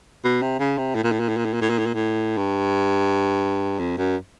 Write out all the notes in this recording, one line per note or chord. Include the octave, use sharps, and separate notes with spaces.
B2
C3
C#3
C3
A2
A#2
A2
A#2
A2
A#2
A2
A#2
A2
A#2
A2
A#2
A2
G2
F2
F#2